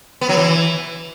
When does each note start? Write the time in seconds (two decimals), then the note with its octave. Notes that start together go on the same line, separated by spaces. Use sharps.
0.21 B3
0.29 F#3
0.37 E3